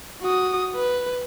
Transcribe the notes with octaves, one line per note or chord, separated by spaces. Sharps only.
F#4 D#6
B4